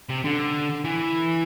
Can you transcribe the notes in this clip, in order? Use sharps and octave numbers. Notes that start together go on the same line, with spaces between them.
C3
D3
E3